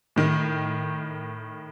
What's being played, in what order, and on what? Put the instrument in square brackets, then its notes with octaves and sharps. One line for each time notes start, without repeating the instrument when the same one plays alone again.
[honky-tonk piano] A2 D#3